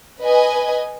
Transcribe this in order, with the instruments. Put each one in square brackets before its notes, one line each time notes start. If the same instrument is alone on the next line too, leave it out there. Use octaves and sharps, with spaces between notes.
[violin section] B4 D#5 G#5